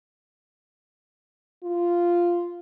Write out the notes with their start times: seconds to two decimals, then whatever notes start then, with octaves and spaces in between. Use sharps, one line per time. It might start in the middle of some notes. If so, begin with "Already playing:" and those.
1.63 F4